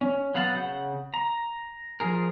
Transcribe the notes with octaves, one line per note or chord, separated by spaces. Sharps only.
C#4
F#3 B3 F5 F#5 A5
C#3 F#5 G6
A#5
F3 G#4 A#4